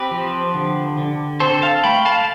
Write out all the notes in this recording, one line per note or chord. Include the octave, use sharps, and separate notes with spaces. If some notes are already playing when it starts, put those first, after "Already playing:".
Already playing: C4 G4 B4
F3
D3
D3
C4 A4 C5
F5 A5
A3 G5 B5
F5 A5